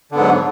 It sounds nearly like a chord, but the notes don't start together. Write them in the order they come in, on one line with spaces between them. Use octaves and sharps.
D3 B3 G#2 F#3